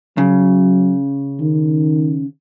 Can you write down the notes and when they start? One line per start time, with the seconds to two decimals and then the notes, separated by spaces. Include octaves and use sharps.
0.18 C#3 F#3
1.41 D#3